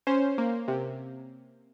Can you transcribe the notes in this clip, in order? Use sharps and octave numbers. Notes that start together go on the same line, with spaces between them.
C#4 C5
A#3
C3